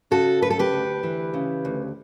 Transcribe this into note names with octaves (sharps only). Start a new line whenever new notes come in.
C#3 F#4 A4
D2 B4
A4
G4 B4
D2
E3
C#3
D2